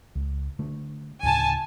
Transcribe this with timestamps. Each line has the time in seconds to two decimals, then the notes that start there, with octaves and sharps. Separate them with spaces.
0.15 C#2
0.59 D3 A3
1.23 D2 A2 C#3 G#5 A5